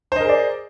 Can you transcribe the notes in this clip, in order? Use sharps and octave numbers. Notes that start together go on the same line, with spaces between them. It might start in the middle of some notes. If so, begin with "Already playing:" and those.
G#4 A#4 C5 D5 D#5